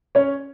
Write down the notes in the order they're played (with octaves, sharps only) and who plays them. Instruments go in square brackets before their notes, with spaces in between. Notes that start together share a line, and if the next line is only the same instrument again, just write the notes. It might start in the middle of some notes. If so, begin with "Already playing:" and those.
[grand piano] C#4 C#5